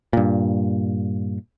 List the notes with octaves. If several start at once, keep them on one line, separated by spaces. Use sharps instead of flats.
G2 A#2